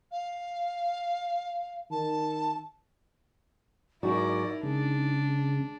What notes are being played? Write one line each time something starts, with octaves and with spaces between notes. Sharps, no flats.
F5
D#3 A5
G#2 F#3 D#4 E4 F#4 A#4 D5
C#3 G#3 D4